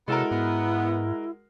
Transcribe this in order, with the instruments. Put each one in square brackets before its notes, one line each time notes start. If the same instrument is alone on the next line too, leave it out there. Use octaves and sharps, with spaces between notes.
[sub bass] C3 [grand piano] G#3 F#4 A#4 [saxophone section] B3 C#4 A4 [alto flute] E4
[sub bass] G#2 [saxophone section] B3